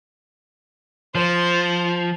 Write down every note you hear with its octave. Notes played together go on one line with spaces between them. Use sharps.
F3 C5